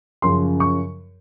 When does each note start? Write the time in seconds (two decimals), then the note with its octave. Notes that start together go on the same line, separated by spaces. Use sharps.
0.22 F#2 C#3 F3 C6
0.60 C#6